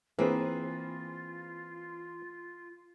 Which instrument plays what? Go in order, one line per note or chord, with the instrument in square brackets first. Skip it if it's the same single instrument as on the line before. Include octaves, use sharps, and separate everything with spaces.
[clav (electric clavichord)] E3 [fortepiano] A#3 G#4 B4 [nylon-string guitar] C4 [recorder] F4